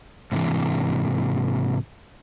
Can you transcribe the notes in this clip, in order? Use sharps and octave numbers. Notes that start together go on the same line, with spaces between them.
G#2 C3 E3